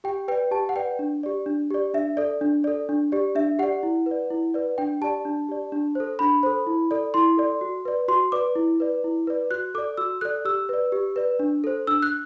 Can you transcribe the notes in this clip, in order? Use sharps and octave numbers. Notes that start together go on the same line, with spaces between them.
G4 G5
B4 D5 G5
G4 A5
F#5
B4 D5 G5
D4
G4 D5
D4
G4 D5
D4 E5
A4 D5
D4
A4 D5
D4
G4 D5
D4 E5
G4 D5 F#5
E4
B4 D5
E4
B4 D5
D4 G5
G4 D5 A5
D4
G4 D5
D4
A4 C5
D4 B5
A4 C5
E4
A4 D5
E4 C6
A4 D5
F#4
B4 D5
F#4 C6
B4 D5 D6
E4
B4 D5
E4
B4 D5
F#4 F#6
A4 D5 D6
F#4 E6
A4 D5 F#6
G4 E6
B4 D5
G4
B4 D5
D4
A4 C5
D4 E6
F#6